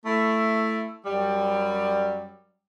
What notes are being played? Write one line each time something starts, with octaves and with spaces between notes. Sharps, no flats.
A3 E4
F#2 F#3 G3